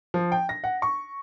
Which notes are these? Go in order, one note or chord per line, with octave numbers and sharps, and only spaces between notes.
F3
G5
A#6
F#5
C#6